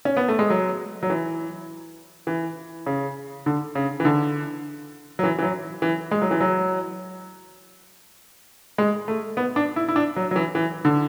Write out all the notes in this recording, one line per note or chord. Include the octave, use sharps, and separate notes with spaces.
C#4
B3
A3
G#3
F#3
F#3
E3
E3
C#3
D3
C#3
E3
D3
F#3
E3
E3
F#3
E3
G#3
F#3
E3
F#3
G#3
A3
B3
D4
E4
E4
D4
F#3
F#3
E3
E3
D3